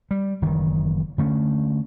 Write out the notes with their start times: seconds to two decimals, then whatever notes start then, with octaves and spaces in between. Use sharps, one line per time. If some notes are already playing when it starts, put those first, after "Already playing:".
0.11 G3
0.42 F#1 D#3 E3
1.18 D3 A3 C#4